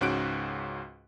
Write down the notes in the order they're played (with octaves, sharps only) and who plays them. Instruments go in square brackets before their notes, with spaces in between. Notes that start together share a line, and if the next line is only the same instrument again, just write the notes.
[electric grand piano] C#2 G#2 C#4 F#4 F#6 D7